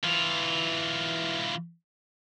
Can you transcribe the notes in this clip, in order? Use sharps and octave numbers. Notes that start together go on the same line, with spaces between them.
E3 F4